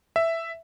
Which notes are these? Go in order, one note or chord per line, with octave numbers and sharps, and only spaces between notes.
E5